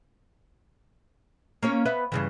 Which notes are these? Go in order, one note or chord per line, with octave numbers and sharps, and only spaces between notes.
A#3 C#4 C#5
B3 B4 E5
G2 C#3 E3